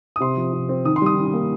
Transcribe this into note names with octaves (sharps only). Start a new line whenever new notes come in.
D#6
C3 C6
F3
C3
C4
D#3 D#6
C6
G3 D#6
D#3
A#3